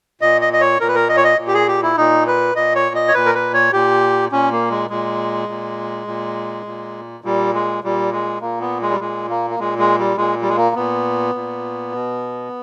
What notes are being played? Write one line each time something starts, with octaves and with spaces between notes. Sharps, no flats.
A#2 D#5
D#5
D#5
C#5
A#2 A#4
B4
A#4
D#5
C#5
D#5
A#2
G4
G#4
G4
E4
A#2 D#4
B4
A#2 D#5
C#5
D#5
C#5
A#2 B4
A#4
B4
C#5
A#2 G4
A#2 C#4
A#3
G#3
A#2 G#3
A#2
A#2
A#2
A#2 G3
G#3
A#2 G3
G#3
A#2 A#3
B3
G#3
G3
A#2 G#3
A#3
A#3
A#2 G#3
G#3
G3
A#2 G#3
G3
G#3
A#3
A#2 B3
A#2
B2